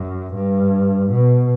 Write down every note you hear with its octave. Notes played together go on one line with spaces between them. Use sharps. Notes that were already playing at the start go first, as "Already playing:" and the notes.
Already playing: F#2
G2
B2